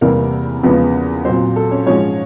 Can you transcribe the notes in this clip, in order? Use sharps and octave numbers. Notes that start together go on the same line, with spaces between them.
E2 C3 E3 G3 A#3 A#4
E2 C#3 F3 G#3 B3 B4
A#2 F#3 C4 C5
A4
C#4 C#5
G#2 F3 G#3 C#4 C#5